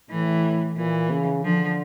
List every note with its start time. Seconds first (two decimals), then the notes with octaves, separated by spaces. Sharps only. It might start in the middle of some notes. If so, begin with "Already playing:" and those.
0.10 A2 E3
0.77 A#2 E3
1.10 C#3
1.44 D3 F3